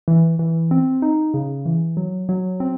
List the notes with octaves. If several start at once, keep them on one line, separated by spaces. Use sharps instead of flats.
E3
E3
C4
D#4
C#3
E3
F#3
F#3
C4